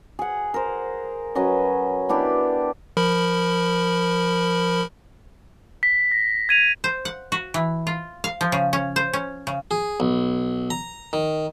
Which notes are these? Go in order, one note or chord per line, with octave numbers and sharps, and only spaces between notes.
G#4 F#5
A#4 C5
F#3 C#4 B4 D#5
B3 D4 E4 G4
F3 A#4 B5
B6
A#6
G#6 D#7 F7
C5
F#5
F#4
E3
F4
F5
F3
C#3
C#4
C5
C#4
C#3
G#4
B1
A#5
D#3